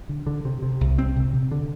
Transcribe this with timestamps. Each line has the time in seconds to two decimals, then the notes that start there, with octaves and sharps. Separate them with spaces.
0.09 D3
0.27 D3
0.45 C3
0.63 C3
0.81 C2
0.98 C2 C4
1.16 C3
1.33 C3
1.51 D3